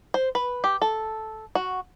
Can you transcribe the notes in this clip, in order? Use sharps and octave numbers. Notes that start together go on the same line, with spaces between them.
C5
B4
G4
A4
F#4